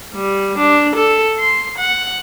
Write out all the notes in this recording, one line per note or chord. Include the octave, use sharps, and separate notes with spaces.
G3
D4
A4
C6
F#5